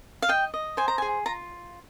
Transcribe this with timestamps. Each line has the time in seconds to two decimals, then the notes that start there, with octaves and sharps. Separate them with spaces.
0.22 F5
0.29 D#5 G5
0.54 D#5
0.77 C5 G#5
0.88 A#5
0.98 G#5
1.02 G#4
1.26 F4 A#5